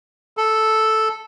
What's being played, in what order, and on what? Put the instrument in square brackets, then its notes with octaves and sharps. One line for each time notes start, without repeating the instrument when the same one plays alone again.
[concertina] A4